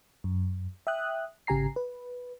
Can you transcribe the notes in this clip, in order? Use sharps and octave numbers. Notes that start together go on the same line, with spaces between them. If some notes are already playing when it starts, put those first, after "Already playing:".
F#2
E5 G5 D#6 F#6
G#1 C#3 G4 G#5 A#5 C7
B4